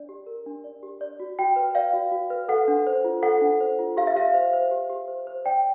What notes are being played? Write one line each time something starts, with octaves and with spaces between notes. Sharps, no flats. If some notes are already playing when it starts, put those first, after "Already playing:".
Already playing: D4 D5
G4
A#4
D4
D5
G4
D5
F#4
F#4 G5
B4
D5 F5
F#4
F#4
B4
A4 F#5
D4
C5
F4
A4 F#5
D4
C5
F4
G4 F5
E5
G4 F5
C5
C5
G4
G4
C5
C5
D5 G5